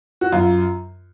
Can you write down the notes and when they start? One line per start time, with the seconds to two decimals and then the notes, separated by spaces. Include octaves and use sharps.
0.21 F#4
0.32 F#2 F4